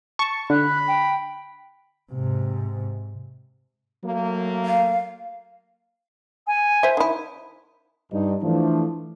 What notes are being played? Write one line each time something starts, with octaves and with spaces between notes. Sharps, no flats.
A5 C#6
D3 B5 F#6
G5
G#2 C3
F#3 A3 A#3
F5
G#5
C5 E5
D#3 E4
G2 D#4
E3 F3 A3 D4